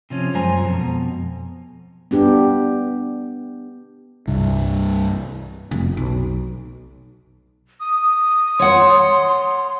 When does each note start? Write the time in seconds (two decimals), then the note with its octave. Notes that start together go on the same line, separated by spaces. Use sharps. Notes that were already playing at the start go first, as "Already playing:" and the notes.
0.10 C3 F3 C#4
0.34 F#2 F3 G#3 C5 G#5 A#5
0.65 F2 B2
2.11 B3 D4 G4
4.27 C2 G2
5.71 F1
5.97 B1
7.80 D#6
8.59 C#5 F#5 C6